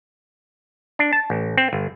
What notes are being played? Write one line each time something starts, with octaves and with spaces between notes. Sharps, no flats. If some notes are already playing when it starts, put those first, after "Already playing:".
D4
A5
A1
C4
G1